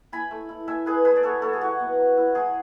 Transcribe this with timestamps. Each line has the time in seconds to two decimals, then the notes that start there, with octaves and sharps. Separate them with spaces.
0.12 E4 G#5 B5
0.31 A3
0.49 E4
0.67 A3 E5 G#5
0.86 E4 G#4 B4
1.05 A3 G#4 B4
1.16 D5
1.23 F#3 A4 C#5
1.42 F#3 A4 C#5
1.53 G#4
1.61 E4 F#4
1.80 B3
1.99 F#3
2.17 E4
2.35 F#3 G#4